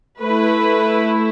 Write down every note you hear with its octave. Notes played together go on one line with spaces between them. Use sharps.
A3 E4 B4